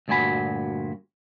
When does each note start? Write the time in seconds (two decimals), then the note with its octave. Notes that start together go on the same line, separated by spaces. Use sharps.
0.08 D2 G2 A#2 F#4 G#5 B5